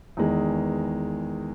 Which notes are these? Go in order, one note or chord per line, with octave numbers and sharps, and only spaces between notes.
E2 D#3 G#3 B3